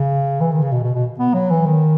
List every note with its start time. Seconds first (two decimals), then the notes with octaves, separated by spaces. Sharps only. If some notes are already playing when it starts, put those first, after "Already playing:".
Already playing: C#3
0.41 E3
0.52 D#3
0.62 C#3
0.72 B2
0.83 B2
0.95 B2
1.19 B3
1.34 F#3
1.50 E3
1.66 D#3